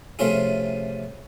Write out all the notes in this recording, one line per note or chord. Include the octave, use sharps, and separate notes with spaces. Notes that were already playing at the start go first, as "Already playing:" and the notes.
C3 F3 A3 C#4 F4 G#4